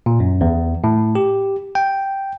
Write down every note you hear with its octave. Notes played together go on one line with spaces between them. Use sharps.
A#2
F#2
E2
A2
G4
G5